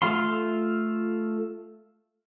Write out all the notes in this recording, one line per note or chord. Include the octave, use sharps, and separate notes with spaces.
A3 F4 F5 C6